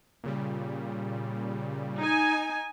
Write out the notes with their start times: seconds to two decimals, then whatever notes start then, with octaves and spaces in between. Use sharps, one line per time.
0.24 A#2 C#3 G3
1.98 D#4 G#5